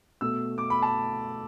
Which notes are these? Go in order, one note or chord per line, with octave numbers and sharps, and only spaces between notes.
B2 A3 E6
D6
B5
A5